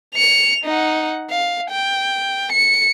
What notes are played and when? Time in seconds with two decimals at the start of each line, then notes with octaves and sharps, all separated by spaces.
0.15 C#7 F7
0.65 D#4 F#5
1.30 F5
1.70 G5
2.52 C#7